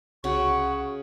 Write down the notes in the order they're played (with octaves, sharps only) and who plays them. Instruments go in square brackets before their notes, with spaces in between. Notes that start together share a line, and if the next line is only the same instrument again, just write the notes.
[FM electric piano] C2 F#4 [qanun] C#3 [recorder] F#5 [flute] C#6